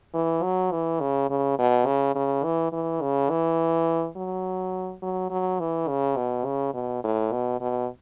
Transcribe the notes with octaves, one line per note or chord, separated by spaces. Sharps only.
E3
F#3
E3
C#3
C#3
B2
C#3
C#3
E3
E3
C#3
E3
F#3
F#3
F#3
E3
C#3
B2
C#3
B2
A2
B2
B2